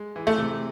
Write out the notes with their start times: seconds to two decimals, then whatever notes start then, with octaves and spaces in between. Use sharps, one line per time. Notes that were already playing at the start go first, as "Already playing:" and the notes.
Already playing: G#3
0.16 E3
0.27 A3
0.38 C3